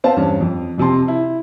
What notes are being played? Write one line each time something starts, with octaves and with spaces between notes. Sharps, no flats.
B3 C4 C5 F5 A5
E2 G2 C#4 D4
F2
F2 C3 A5 C6
E4